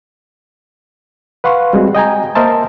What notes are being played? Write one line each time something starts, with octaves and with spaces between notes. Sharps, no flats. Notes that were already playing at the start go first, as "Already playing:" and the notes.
B4 F5 F#5 C6 C#6
G3 G#3 C4 F#4
D#5 G5 G#5 A#5
A#3 A#4 C5 D#5 E5 A5